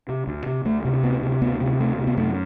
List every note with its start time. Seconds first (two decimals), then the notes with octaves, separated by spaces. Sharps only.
0.09 C3
0.27 D2
0.46 C3
0.65 D2 A3
0.85 C3
1.03 D2 B3
1.23 C3
1.42 D2 B3
1.60 C3
1.80 D2 A3
1.98 C3
2.07 B3
2.17 F#2 A3